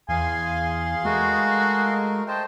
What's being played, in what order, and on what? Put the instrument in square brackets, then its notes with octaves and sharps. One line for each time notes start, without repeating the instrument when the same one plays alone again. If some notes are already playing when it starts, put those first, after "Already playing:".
[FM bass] E2 [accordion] G#4 F5 C6 [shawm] G#5
[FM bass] G#3 [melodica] A3 A#4 D#5 [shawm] F#4
[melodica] C5 D#5 A5 [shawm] G5